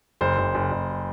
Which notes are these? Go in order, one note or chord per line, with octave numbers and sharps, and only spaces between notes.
F#1 C5
F#1
F#1
F#1